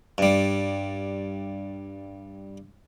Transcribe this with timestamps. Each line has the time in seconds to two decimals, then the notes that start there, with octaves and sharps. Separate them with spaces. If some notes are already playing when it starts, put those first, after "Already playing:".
0.18 G2 G3